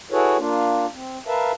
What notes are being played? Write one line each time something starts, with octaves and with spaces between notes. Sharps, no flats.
E4 F#4 G#4 A4 B4 C#5
A#3 D4 F4
C4
A#4 B4 E5 F5 A5